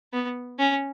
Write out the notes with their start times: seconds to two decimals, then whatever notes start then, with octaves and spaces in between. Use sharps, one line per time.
0.13 B3
0.59 C#4